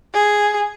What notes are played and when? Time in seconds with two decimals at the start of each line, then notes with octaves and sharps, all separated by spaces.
0.14 G#4